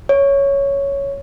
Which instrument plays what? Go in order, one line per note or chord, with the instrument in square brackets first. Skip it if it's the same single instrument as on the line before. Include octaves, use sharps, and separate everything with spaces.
[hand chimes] C#5